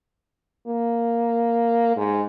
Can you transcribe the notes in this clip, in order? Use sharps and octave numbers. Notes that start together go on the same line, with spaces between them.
A#3
G#2